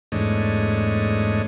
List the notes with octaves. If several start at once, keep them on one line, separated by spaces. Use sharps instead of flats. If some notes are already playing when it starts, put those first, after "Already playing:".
E2 G#2 A3 D4 C#5 D#5